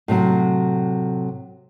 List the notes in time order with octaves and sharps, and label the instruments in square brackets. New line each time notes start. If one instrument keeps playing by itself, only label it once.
[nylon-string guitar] A2 C3 F#3